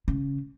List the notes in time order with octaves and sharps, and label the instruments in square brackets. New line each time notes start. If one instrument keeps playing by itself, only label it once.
[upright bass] C#3